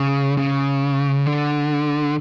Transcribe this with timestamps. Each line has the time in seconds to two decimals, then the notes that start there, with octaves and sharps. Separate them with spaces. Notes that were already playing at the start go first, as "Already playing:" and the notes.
Already playing: C#3
0.37 C#3
1.26 D3